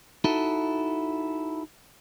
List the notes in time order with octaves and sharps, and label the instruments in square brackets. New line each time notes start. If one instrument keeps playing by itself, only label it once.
[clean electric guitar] D#4 E4 F#4 A4